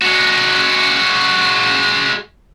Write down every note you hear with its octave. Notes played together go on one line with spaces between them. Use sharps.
G#3 F#4